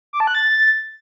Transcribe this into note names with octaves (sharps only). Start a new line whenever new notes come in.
D6
A5
F#6
A6